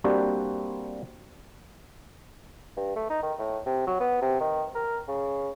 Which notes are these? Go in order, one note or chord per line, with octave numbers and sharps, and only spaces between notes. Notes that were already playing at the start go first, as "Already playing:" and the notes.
G3 A#3 C4 D4 F#4 G4
G2
A3
D#4
D#3
A2
C3
F#3
B3
C3
D#3
A#4
C#3